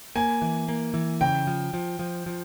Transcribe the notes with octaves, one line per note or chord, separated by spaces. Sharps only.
A#3 G#5
E3
A#3
E3
C#3 G5
F3
F3
F3
F3